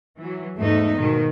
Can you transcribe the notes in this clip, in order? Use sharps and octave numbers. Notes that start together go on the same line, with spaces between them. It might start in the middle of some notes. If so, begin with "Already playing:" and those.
E3 F#3
E2 G#2 A3 B3 D#4
G#2 B2 D#3